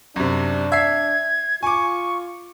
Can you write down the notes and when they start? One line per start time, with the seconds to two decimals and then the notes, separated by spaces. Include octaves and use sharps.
0.16 F#2 C3 D4
0.72 E5 G#6 C7
1.63 F4 G#5 C#6 D6